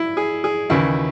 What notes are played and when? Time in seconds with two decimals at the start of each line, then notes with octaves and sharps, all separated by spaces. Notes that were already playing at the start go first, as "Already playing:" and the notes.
Already playing: E4
0.17 G#4
0.44 G#4
0.70 D#2 C#3 E3 E4